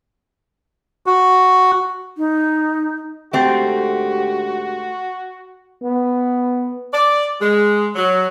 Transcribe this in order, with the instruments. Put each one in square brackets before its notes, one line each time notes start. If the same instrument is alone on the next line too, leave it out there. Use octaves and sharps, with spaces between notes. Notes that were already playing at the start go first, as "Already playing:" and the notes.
[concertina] F#4
[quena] D#4
[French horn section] D2 G#2 G4 [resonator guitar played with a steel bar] A3 C4 [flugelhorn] F#4
[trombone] B3
[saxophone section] D5
G#3
F#3